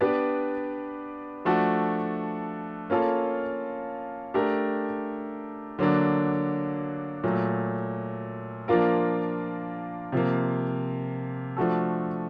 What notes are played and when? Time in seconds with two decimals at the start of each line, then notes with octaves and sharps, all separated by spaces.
0.01 B3 D4 G4 B4 D5
1.45 F3 A3 D4 F#4 A4
2.90 A#3 C#4 F4 A4
4.34 A3 D4 G4 A#4
5.79 D3 F#3 A#3 D4
7.24 A#2 F#3 A3
8.68 F3 A#3 D4 F4 A#4
10.12 C3 F3 A#3
11.57 F3 A3 D4 F#4 A4